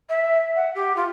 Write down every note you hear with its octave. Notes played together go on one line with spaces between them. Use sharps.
E5
F#5
G4
F4